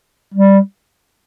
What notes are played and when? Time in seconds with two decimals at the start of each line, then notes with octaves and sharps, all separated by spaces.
0.34 G3